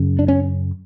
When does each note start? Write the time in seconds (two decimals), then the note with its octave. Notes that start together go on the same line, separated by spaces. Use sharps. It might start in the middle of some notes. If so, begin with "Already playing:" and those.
Already playing: F#2 C#3
0.19 D4
0.28 C#4